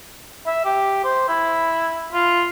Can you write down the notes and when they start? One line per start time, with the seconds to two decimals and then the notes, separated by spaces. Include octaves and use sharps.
0.47 E5
0.65 G4
1.04 C5
1.28 E4
2.13 F4